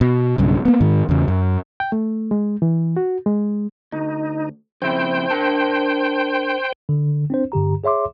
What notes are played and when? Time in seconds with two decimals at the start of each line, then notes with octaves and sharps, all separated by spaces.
0.01 B2
0.38 B1 G2 C#3
0.65 A#3 B3
0.81 G#2 D#3
1.09 E2 C#3
1.28 F#2
1.80 G5
1.92 A3
2.31 G#3
2.62 E3
2.97 F#4
3.26 G#3
3.92 D2 D#4
4.82 F2 C#3 E4 C5 G5
5.30 D4 A#4 A5
6.89 D3
7.30 C4 D4 C5
7.52 G2 D3 G4 A#5
7.84 G#4 C#5 E5 C6 D6